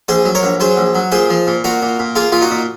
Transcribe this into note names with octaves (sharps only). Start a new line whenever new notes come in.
A#1 G#4 C5
F#3
A#4 C#5
A#1
F#3 G#4 C5
A#1
F#3
A#2 G#4 C5
F3
A#2
A#2 F#4 A#4
A#2
A#2
A#3 F4 G#4
A#2 F4
D#4 F#4
A#2